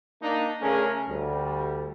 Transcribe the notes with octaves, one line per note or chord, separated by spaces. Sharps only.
A#3 D4 D#4
C#3 A3 C#4 D4 G#4 A#4
D2 G3